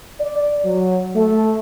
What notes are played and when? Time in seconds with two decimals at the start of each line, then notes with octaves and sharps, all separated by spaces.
0.20 D5
0.65 F#3
1.16 A3